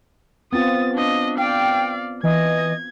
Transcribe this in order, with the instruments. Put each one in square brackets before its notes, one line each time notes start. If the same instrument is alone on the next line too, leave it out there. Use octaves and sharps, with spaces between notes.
[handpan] B3 C4 F4 [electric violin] D#6 A6
[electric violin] D4 D#5
[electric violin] D5 F5 [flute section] G5
[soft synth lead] E3 [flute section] D#5 [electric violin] G#6